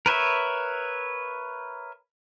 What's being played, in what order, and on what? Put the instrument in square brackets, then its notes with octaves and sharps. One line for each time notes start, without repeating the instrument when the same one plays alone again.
[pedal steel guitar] A#4 B4 C#5 E5